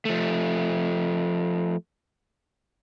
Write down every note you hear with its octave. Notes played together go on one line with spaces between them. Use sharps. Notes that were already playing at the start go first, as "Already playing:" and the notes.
F3 A3